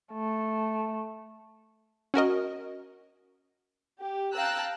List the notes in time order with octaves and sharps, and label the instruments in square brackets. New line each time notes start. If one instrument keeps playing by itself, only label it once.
[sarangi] A3
[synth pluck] C#4 F#4 A#4 D#5
[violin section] G4
F5 G5 A5 A#5 E6 F#6